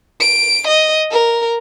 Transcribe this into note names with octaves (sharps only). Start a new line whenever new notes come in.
D7
D#5
A#4